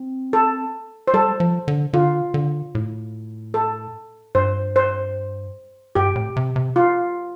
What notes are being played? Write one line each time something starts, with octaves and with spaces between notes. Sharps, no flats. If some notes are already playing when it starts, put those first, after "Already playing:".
Already playing: C4
A4
C5
G3 A4
F3
D3
D3 F4
D3
A2
A4
G2 C5
C5
G2 G4
A2
C3
C3
F4